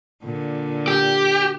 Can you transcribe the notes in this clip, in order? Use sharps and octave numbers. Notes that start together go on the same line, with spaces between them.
A#2 D3
G4